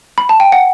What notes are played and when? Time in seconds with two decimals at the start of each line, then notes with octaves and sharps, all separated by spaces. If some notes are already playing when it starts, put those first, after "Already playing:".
0.18 B5
0.29 A5
0.40 G5
0.52 F#5